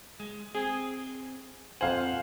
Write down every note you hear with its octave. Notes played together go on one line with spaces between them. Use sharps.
G#3
C4 G#4
F2 C5 F5 F#5 G#5